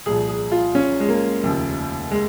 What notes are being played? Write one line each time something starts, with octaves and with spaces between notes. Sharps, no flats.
C2 A#2 F3 G#4
G#4
F4
C#4
G#3
A#3
F1 D#2 C#3 F3
G#3